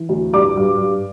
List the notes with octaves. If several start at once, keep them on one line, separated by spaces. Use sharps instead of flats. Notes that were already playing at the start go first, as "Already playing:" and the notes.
Already playing: E3
D2
G2 D5 D6
G2
G2